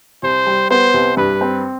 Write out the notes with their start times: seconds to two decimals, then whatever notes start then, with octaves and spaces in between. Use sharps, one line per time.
0.22 C2 C5
0.46 G3
0.71 B3 C5
0.94 C2
1.17 G2 B4
1.41 C4